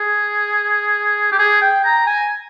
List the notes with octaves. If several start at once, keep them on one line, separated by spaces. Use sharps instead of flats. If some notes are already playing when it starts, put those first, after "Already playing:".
Already playing: G#4
G4
G#4
G5
A#5
G#5